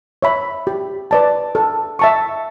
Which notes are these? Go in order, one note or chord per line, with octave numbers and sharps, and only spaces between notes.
C#5 E5 B5
G4
B4 D5 A5
A4
E5 A5 C#6